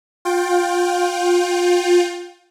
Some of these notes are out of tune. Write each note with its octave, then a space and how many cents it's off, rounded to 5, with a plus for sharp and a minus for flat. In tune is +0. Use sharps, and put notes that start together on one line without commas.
F4 +25 G5 +0